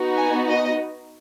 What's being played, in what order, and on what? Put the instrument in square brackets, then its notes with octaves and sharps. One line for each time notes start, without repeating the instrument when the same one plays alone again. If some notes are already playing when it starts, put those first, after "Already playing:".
Already playing: [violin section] B3 D#4 F#4
G#5
D#5